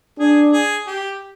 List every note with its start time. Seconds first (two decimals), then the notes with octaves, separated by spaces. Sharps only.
0.19 D4 G#4
0.53 G#4
0.87 G4